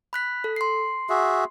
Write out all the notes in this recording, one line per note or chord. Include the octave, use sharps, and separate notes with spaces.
B5 F#6 B6
A4
C6 C7
F#4 G#4 E5